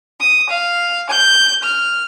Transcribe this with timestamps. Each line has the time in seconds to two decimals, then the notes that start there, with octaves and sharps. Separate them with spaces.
0.20 D#6
0.49 F5
1.09 G6
1.63 F6